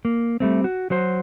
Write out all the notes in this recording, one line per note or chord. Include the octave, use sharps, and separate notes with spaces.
A#3
G3 A3 C4
F#4
F#3 F#4 C5